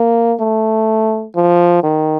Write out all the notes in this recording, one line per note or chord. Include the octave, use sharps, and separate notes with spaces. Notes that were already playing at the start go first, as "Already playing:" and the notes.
Already playing: A#3
A3
F3
D#3